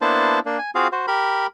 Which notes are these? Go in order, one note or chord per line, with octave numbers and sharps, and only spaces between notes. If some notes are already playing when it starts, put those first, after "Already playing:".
A#3 B3 D4 E4 C5 A5
A#3 D4
G#5
C4 F4 F#4 G#4 F5
F#4 C5
G4 A#4 B5